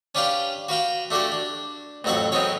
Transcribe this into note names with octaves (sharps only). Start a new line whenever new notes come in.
C#4 D4 G4 B4 F5 G5
F#4 B4 F5 G5
A3 D4 F#4 G4 A4
D4
A1 F2 F#3 A4 F#5 C#6
F#3 G#3 B3 C4 D#4 C#5